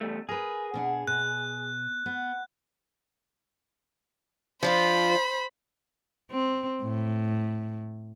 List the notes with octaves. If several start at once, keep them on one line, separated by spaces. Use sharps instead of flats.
E2 G3 A3
G#4 A#4 B4
B2 D4 F#5
B2 F#6
B3
F3 D4 F4 C5 B5
C4
A2